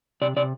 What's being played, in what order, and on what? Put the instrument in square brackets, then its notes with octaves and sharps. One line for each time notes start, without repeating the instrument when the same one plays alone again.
[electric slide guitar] C3 D5
C3 D5